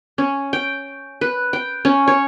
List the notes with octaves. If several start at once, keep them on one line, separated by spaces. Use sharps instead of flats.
C#4
G5
B4
G5
C#4
C#5